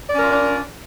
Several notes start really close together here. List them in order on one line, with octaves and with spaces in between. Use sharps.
D5 C#4 A#4 F4 D4